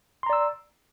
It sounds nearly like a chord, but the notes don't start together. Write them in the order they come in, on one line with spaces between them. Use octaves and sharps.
C6 A#5 D5 E6